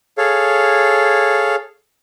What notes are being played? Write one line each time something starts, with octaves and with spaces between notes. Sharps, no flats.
G#4 A4 C#5 F5